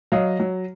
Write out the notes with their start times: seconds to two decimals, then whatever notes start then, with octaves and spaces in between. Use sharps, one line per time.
0.12 F#3 D#5 F5
0.40 F#3